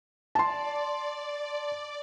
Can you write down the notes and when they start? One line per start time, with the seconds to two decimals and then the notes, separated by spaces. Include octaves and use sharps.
0.35 D5 A5 C6